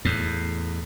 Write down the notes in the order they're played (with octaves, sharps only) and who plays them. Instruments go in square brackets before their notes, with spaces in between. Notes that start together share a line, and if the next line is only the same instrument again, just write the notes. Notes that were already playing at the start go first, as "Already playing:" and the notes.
[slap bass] E2 A2